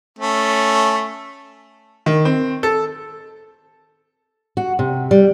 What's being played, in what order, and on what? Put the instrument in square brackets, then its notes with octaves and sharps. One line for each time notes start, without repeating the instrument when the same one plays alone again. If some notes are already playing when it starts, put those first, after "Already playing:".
[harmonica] A3 C#4
[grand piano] D#3
C4
A4
[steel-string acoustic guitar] F#4
C3
G3